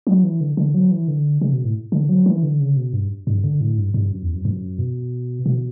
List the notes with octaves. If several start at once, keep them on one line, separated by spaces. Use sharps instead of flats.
F#3
E3
D3
D3
F#3
E3
D3
C#3
B2
A2
D3
F#3
E3
D3
C#3
B2
G2
G2
D3
A2
G2
G2
F#2
E2
F#2
F#2
B2
B2